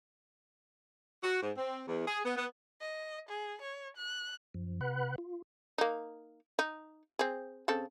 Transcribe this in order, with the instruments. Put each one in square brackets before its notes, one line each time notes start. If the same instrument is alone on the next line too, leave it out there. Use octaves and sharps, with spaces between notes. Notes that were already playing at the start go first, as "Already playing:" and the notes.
[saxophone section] F#4
G#2
C4
E2
G#4
B3
B3
[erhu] D#5
G#4
C#5
F#6
[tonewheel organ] F#2 F3
C3 B4 F#5 B5 F#6
F4
[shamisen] A#3 D#4
D#4
C4 G#4
C#3 C4 A4